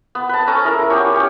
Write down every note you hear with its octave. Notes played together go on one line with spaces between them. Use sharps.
B3
B4 A5
C#4 A4 G#5 A#5
E4 G#4 A#4
B3 G4 G#4 C#5
C#4 G4